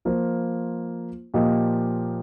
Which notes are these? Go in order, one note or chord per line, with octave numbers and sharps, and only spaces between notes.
F3 A#3 F4 C5
A#2 F3 A#3 G4 D#5